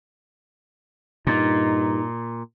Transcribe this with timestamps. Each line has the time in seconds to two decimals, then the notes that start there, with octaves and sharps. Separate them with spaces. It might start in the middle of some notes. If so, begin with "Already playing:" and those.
1.27 G2 A#2 D#4